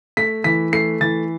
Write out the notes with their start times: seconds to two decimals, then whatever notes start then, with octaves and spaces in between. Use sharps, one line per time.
0.17 A3 B6
0.44 E3 B6
0.73 A3 C7
1.01 E3 A6